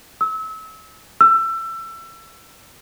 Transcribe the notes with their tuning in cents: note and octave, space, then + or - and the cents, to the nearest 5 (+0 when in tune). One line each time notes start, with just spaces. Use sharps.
E6 -30
E6 +25